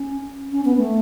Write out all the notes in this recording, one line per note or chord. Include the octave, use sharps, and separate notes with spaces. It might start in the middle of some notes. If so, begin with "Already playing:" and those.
Already playing: C#4
C#4
B3
A3